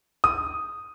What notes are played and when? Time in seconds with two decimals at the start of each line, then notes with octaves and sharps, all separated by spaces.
0.24 D#6